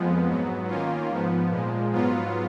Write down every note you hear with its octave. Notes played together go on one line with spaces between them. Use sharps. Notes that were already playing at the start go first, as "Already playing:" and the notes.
Already playing: F2 F3 G#3 B3
G#2 F#3 B3
D#3 A#3 C#4 F4
G#2 F3 B3
A#2 F3 G#3
G#2 F#3 B3 F4